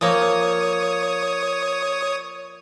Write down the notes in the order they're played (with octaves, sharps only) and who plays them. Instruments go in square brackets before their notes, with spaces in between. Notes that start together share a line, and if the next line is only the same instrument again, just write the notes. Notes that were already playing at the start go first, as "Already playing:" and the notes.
[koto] F3 A#3 [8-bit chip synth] C#5 D#6